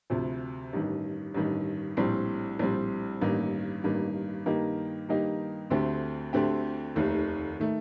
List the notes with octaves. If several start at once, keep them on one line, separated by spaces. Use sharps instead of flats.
D2 C3 F3
A1 G2 D#3
A1 G2 D#3
A#1 A2 G3 C4
A#1 A2 G3 C4
A1 G2 D#3 A#3
A1 G2 D#3 A#3
G2 D#3 A#3 D#4 G4
G2 D#3 A#3 D#4 G4
D2 D3 A3 C4 G4
D2 D3 A3 C4 G4
F1 D#2 D#3 A3
D#3 A3